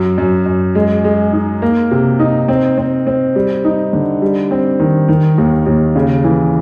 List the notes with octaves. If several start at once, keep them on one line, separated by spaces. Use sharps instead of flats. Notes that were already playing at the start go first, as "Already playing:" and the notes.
Already playing: F#2
F#2
F#2
G#3
G#3
D#4
A#3
C3
D#4
C4
C4
C4
G3
D#4
D3
G3
C4
D#3
D#3
D#2
D#2
C#3
E3